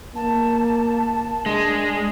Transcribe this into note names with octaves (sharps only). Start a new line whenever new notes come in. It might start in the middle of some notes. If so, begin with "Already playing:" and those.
A#3 A5
G#3 D4